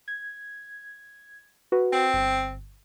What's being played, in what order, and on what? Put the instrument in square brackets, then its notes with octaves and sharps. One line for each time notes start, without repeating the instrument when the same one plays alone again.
[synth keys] G#6
F#4 B4
[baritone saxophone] C4
[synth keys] G1